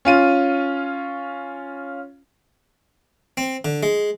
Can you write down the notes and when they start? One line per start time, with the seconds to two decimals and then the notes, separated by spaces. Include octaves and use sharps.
0.05 C#4 F4 D#7
3.37 C4
3.65 D3
3.83 G#3